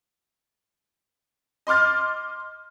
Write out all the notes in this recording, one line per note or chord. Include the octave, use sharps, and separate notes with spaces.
D#5 C6 D6 F6 A6